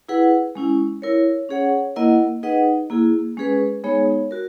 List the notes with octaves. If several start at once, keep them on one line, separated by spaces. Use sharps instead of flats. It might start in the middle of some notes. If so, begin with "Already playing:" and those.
E4 G#4 B4 F#5
G#3 C#4 E4
E4 A#4 C#5
C#4 G#4 C#5 F#5
A#3 E4 A#4 D#5 F#5
D#4 G#4 B4 D#5 F#5
A#3 E4 G#4
G#3 C#4 G#4 B4
G#3 B3 D#4 G#4 C#5
F#4 A#4